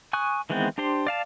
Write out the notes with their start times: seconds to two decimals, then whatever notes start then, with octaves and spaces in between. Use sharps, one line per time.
0.13 G#5 C#6 D#6 F#6
0.50 D#3 E3 G#3 B3 C4
0.78 D4 G4 C5 C6
1.07 D5 F5 A5